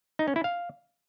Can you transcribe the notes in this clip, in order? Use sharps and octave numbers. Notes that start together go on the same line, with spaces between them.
D#4
C#4
E4
F5